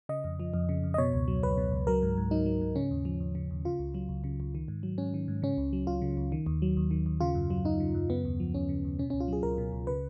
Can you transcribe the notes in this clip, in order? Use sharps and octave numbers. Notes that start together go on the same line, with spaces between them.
C#3 D#5
F2
F3
F2
C#3
F2
D#5
B2 C#5
C#2
F#3
C#2 B4
B2
C#2
F#3 A#4
G#2
G#2
F#3 D#4
F#3
G#2
C#3 C#4
D#2
F3
D#2
C#3
D#2
C#3 F4
C#2
F#3
C#2
C#3
C#2
D#3
G#2
F#3
G#2 C#4
D#3
G#2
C#3 C#4
C#2
F#3
C#2 F4
C#3
C#2
D#3
D#2
F#3
D#2
D#3
D#2
C#3 F4
F#2
F#3
F#2 D#4
C#3
F#2
C#3 B3
D#2
F3
D#2 C#4
C#3
D#2
B2 C#4
C#4
C#2
F4
F#3 G#4
C#2 A#4
B2
C#2
C#3 B4